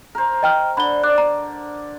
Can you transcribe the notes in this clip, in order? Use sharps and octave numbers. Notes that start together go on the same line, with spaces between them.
A#4 C5
D#5 G5 F6
D3 B5 G7
D5 F#6
A#5